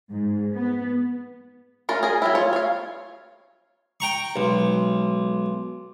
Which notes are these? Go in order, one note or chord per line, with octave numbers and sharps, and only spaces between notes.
G#2
B3
A3 C#4 D4 F4 A#4
G#4 A#4
F#3 G3 E4
F4 C#5
C#5 F5
G5 A#5 C#6
B1 G#3 C6 D6